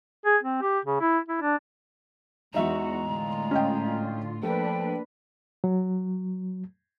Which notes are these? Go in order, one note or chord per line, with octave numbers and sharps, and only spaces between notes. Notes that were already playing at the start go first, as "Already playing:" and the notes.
G#4
C4
G4
C#3
E4
E4
D4
E2 G#3 D#4 F#4 E5 A#5
A2 D3 F4
C#4 D#5 G5
F3 A3 A#3 D4 B4 G5
F#3